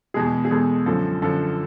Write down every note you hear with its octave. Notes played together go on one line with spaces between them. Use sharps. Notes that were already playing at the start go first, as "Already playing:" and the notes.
E2 B2 G#3 G#4
G#4
E2 B2 G#3 A4
F#2 D3 F3 A4
F#2 D3 F3 A4